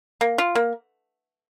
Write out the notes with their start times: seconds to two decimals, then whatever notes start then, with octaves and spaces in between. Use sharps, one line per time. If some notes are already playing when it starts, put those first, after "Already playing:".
0.21 A#3
0.38 F4
0.55 A#3